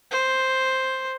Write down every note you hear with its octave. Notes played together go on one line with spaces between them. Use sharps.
C5